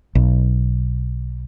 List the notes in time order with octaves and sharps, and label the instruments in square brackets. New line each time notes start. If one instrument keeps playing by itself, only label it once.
[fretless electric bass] B1